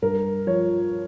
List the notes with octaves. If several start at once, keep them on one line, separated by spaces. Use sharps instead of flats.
G2 A#4
F3 C#5